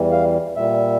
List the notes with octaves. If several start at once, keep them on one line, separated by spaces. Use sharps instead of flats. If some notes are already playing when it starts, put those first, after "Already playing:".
Already playing: E2 E3 G3
F5
A#2 G3 E5